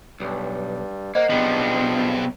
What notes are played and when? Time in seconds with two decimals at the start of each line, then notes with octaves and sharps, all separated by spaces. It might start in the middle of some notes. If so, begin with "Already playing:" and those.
0.20 B1 G2 G3
1.15 A#3 C5 D#5 F#5
1.30 B1 C#3 F3 G3 B3 C4 D4